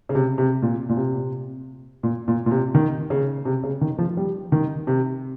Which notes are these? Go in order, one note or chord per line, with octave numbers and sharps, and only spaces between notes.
C#3
C3
C3
A#2
A#2
C3
A#2
A#2
A#2
C3
D#3
C#3
C3
C#3
D#3
F3
G3
D#3
C3